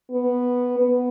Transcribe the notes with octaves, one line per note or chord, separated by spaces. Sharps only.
B3
B3